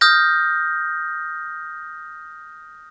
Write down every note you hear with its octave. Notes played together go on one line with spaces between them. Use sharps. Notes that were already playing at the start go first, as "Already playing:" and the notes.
D#6 F6 G6 A#6